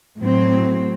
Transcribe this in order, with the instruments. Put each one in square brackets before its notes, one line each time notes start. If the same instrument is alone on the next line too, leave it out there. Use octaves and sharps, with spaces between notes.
[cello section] A2 F#3 C4